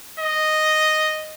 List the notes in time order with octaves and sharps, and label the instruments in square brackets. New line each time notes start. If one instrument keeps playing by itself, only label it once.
[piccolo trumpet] D#5